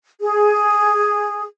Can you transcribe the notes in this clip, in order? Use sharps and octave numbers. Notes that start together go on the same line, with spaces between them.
G#4